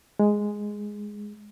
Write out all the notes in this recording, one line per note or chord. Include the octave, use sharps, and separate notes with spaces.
G#3